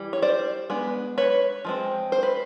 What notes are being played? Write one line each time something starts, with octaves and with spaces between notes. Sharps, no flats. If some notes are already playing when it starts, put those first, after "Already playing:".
Already playing: E3 G3
C#5
C5 D5
G#3 B3 D4
B4 C#5
F3 G#3 C4
C5
B4